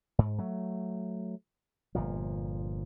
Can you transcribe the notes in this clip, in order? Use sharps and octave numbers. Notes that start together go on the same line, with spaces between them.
G#2
F#3 A3
G1 A#2 F3